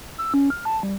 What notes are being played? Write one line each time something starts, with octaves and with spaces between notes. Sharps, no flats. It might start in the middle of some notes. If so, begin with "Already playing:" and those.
E6
C#4
F6
A5
G3